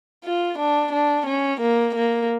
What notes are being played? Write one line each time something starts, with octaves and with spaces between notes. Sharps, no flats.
F4
D4
D4
C#4
A#3
A#3